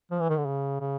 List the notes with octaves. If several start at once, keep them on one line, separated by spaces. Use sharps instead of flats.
F3
E3
D#3
D3
C#3
C#3